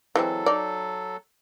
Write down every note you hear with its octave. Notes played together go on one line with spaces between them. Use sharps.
E3 F#3 G#3 C4 A4
D#4 D5